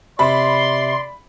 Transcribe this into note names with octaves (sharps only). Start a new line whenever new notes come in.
C3 D5 B5 C6